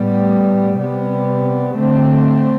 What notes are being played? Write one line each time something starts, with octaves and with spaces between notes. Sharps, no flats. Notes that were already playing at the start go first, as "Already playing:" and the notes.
Already playing: A2 G3 B3
C3 G3 B3
D3 A3 C4